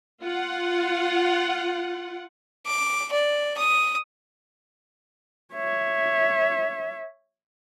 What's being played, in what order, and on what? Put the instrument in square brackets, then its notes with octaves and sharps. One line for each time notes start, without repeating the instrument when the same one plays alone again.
[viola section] F4 F#5
[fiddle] D6
D5
D#6
[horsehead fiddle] C#5 E5